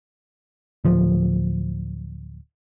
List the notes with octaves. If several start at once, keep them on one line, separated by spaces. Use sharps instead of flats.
D1 F3